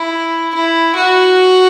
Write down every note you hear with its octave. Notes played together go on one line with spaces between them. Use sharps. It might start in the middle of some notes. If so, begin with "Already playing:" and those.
Already playing: E4
E4
F#4